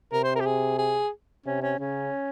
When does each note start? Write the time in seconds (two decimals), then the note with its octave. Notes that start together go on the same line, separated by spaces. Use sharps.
0.12 C3 A#4
0.24 C5
0.35 A#4
0.40 G4
0.46 G#4
0.79 G#4
1.46 C3 C#4
1.62 C#4
1.79 C#3 C#4